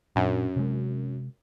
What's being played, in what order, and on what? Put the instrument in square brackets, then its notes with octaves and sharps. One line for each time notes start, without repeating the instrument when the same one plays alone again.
[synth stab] F#2 [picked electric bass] A#2 D4
[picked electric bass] C3 G#3